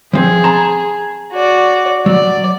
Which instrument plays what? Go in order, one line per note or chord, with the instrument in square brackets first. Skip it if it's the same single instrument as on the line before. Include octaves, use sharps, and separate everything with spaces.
[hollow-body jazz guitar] F3 C4 [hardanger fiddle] G#4
[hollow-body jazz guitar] A5 A#5 C6
[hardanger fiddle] F#4 D5
[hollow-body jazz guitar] F#3 [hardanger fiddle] D5